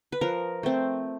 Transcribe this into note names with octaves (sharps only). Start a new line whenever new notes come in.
B4
F3 A#4
A3 C4